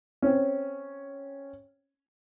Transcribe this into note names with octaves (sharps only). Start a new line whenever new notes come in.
C4 C#4